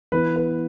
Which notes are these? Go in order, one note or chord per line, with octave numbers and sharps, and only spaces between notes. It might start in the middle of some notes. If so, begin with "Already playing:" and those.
E3 B3 E4 B4
B4